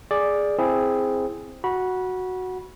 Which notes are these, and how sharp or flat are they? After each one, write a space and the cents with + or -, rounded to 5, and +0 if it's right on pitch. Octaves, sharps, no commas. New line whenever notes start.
G#4 +0 D5 +0
C4 +0 E4 +5 G#4 +0
F#4 +0 B5 -25